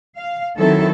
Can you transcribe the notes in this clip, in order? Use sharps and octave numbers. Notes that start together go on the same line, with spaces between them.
F5
D#3 F#3 C4 E4 A4